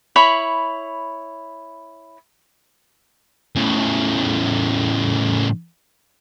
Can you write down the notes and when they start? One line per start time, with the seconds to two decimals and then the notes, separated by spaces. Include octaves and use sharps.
0.16 E4 C#5 B5
3.56 A2 C#3